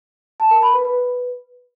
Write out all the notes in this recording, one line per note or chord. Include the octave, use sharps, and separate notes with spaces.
A5
A#4
B5
B4
B4